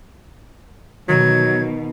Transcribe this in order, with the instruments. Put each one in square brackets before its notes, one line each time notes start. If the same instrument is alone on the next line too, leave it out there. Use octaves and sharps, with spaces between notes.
[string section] B2 [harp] D#3 [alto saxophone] F#3 [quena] G#6